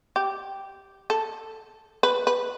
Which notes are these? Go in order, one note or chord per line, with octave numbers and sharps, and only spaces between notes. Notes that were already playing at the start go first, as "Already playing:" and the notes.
G4
A4
B4
B4